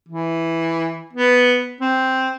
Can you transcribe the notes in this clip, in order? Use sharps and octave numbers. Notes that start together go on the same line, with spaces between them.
E3
B3
C4